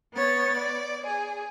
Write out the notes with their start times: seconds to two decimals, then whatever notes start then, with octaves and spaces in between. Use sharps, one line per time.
0.13 B3 C#5 A6
0.57 D5
1.05 G#4